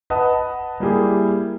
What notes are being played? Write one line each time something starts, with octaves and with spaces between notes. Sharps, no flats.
B4 D#5 F#5 A5 D#6
G3 A#3 E4 G4 G#4